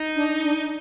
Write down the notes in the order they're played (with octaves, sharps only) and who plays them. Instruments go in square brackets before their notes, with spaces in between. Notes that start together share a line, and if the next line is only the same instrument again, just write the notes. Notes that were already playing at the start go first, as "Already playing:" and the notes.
Already playing: [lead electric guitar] D#4
[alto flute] D4
D4